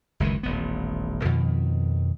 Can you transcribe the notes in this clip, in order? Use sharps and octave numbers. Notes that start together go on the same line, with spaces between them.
F#1 C#2 D#3 E3
D#1 A1 B3
F2 B2 D#3